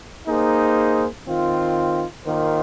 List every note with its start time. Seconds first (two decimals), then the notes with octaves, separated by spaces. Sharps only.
0.26 A#3 D#4 G#4 C5
1.26 D#3 C4 F4
2.25 D#3 A#3 F4 C5